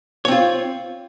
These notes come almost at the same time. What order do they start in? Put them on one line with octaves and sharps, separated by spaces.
C#5 C4 F4